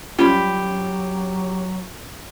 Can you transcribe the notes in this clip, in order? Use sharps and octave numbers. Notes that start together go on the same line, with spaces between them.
F#3 G3 C#4 F4 G4 B5